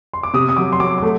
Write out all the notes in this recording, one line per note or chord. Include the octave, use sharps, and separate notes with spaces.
C6
D6
C3 D#6
D#6
F#3 D6
C6
F#3 D6
D6
A3